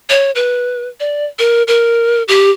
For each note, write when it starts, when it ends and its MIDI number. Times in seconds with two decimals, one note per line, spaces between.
0.10 0.31 73
0.35 0.88 71
1.00 1.26 74
1.39 1.63 70
1.68 2.23 70
2.28 2.50 67